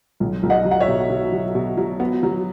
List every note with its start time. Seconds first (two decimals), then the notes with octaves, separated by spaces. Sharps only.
0.20 B1
0.43 B1
0.50 D#5 F#5
0.65 F#3
0.71 F#5
0.80 C#5 E5
0.88 B2
1.10 B2
1.32 F#3
1.55 B2
1.77 F#3
2.00 B3
2.23 F#3